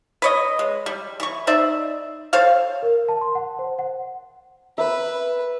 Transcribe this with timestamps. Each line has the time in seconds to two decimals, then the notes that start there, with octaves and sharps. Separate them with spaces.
0.22 B4 C#5 D#5
0.59 G#3
0.86 G3
1.20 E3 C#6
1.47 D#4 C5 D5 E5
2.33 A4 C5 C#5 F5
2.83 A#4
3.09 A5
3.21 C6
3.35 F#5
3.59 C5
3.79 F#5
4.78 B4 E5